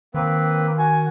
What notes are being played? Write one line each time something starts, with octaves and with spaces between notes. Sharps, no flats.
D#3 A#3 C4 B4
F#4 G#5